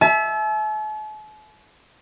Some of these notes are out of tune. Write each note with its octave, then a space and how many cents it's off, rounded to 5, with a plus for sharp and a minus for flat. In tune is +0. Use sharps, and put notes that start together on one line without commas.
E5 +0 A5 -45